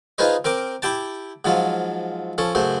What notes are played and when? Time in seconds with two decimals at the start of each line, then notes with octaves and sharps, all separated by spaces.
0.18 D#4 F4 G#4 B4 C5 D#5
0.44 C4 A#4 G5 D6
0.82 E4 G4 G5 A5
1.45 G#2 F3 F#3 F4
2.38 F3 C#4 A4
2.55 F#2 C#3 A3 C5